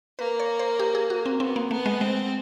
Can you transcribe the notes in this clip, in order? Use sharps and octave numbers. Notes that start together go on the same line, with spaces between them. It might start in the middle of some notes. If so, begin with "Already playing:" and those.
A#3 B4
C#5
C5
G4
G#4
F#4
C4
B3 C4
A#3
A3 B3
G#3
G#3 C4